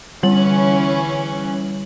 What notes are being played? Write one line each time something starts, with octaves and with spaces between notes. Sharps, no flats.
D3 E3 G3 C#4 F#7